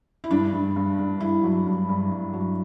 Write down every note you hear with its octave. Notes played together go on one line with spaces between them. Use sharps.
E4
G2 D4
G2
G2
G2
G2 E4
F#3
G2
G2
G2
F#3